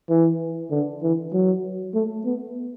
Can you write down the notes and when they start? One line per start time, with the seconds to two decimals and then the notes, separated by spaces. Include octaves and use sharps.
0.09 E3
0.71 D3
1.03 E3
1.33 F#3
1.94 A3
2.25 B3